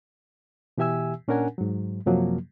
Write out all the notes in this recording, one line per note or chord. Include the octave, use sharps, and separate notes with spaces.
B2 E3 G4 E5 G#5 E6
A#2 C#4 D4 A#4 F#5 G#5
G#2 F#3
F#2 C3 F3 F#3 A#3